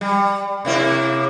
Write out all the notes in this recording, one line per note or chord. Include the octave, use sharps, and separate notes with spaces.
G3
C3 A#3 E4